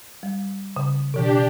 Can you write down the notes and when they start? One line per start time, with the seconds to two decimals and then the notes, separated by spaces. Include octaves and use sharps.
0.23 G3
0.76 C#3
1.14 B2 E3 D4 G4